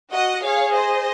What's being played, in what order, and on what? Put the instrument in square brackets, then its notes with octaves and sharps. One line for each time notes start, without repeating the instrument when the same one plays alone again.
[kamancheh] F#4 [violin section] D#5 F#5
[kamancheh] G#4 [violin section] C#5 F5
[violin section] C5 D#5